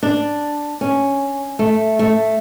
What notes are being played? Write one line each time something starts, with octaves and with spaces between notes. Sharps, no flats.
D4
C#4
A3
A3